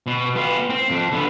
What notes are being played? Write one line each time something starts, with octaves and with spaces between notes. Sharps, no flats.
B2
B3 F4
C4
F2
D3 B3